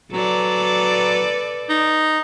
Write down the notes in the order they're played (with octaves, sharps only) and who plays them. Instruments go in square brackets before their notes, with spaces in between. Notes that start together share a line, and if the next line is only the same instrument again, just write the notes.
[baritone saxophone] F#3 [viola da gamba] A4 B4 D5
[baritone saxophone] D#4